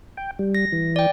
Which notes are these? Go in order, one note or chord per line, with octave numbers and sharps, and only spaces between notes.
G5
G3
A#6
E3
D5 G5